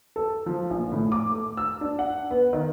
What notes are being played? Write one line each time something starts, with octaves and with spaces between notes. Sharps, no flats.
A4
F3
A#1
A2
D6
A3
E6
D4
F#5
B3
D#3